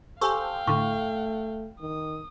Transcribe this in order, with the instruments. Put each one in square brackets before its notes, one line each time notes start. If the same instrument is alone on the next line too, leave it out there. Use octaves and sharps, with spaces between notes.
[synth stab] G4 A4 C5 [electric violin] F5 G5 [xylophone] G#5 C#6
[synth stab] A2 D3 [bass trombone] A3 [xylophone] C#6
[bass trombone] D#3 [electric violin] D#6